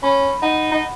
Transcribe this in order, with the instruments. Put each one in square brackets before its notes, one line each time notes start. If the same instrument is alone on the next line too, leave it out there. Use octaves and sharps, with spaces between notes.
[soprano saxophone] C#4 [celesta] B5
[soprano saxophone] D#4 [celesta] F#5
[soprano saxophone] D#4